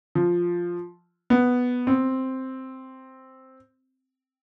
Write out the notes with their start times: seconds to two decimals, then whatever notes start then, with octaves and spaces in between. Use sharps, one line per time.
0.15 F3
1.30 B3
1.87 C4